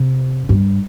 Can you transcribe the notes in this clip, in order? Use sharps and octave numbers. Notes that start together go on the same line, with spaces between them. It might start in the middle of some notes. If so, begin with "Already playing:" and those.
Already playing: C3
G2